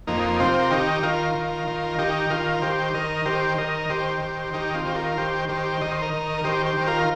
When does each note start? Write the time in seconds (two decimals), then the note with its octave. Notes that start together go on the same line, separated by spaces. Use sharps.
0.07 F2 A#3 D#4
0.40 C3 C4 F4
0.59 A#4
0.71 D#3 D#4 G4
1.03 D#3 F4 A#4
1.35 D#3
1.67 D#3
1.99 D#3 D#4 G4
2.30 D#3 F4 A#4
2.62 D#3 G4 C5
2.94 D#3 A#4 D#5
3.26 D#3 G4 C5
3.58 D#3 A#4 D#5
3.90 D#3 G4 C5
4.21 D#3
4.53 D#3 D#4 G4
4.74 C4 F4
4.85 D#3 G4
4.95 F4 A#4
5.17 D#3 G4 C5
5.49 D#3 G4 C5
5.81 D#3 D#5
5.91 C5
6.02 A#4 D#5
6.13 D#3
6.38 A#4
6.44 D#3 G4 C5
6.66 G4 C5
6.77 D#3
6.87 F4 A#4